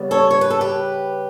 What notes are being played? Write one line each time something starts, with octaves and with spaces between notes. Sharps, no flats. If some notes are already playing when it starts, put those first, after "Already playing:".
Already playing: C#3 G3 B3
A4 C#5
C#5
B4
A4
G4 B4